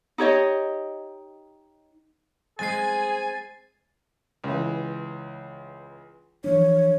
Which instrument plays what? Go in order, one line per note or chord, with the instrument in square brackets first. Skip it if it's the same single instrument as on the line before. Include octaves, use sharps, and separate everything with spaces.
[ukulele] D#4 G4 C#5 D#5
[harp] G#3 C4 [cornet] G#4 [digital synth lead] G#5 [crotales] A6 C7
[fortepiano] C#2 E3
[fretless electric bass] E3 F3 D4 [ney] C#5